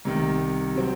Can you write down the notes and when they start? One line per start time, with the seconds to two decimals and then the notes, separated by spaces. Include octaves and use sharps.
0.05 C2 C3 D#3
0.75 C3 F#3 C4